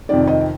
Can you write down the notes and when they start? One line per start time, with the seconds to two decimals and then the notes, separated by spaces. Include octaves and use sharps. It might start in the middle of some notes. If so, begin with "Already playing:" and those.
0.09 F2 C3 D#3 D5
0.27 D#5